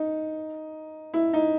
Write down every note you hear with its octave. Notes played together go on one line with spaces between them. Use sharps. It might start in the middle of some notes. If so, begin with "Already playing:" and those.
Already playing: D#4
E4
D#4